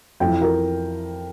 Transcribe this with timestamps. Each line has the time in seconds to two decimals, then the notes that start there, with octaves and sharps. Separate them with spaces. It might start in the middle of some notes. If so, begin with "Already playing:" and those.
0.20 F2 E3 G5
0.41 A#4